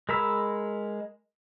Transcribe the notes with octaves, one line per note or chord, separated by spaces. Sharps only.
G#3 A#4 A#5 B5 E6